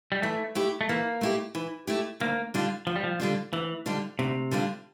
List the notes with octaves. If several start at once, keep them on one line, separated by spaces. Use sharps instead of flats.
G3
E3 A3
A3 E4 G4
A3
E3 A#3
A3 E4 G4
E3
A3 E4 G4
D2 A#3
D3 G3 D4 F4
D2 F3
G3
F3
D3 G3 D4 F4
D2 E3
D3 G3 D4 F4
D2 C3
D3 G3 D4 F4